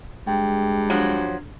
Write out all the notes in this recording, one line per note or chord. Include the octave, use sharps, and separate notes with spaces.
G2 G#3 G5
F3 F#3 D4